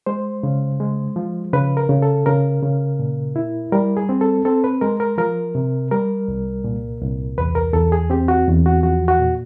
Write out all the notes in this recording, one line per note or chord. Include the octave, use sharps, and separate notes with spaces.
G#3 C5
C#3
G#3
F3
C#3 B4
A#4
C#3
A4
C#3 A#4
C#3
A#2
E4
G3 A#4
G#4
C4
A4
C4 A4
B4
G#3 A#4
A#4
F3 A#4
C3
G3 A#4
C2
A#2
C2
E2 B4
A#4
E2 A4
G#4
C4 G4
F#4
E2
F#4
F3 F#4
F#4
A#2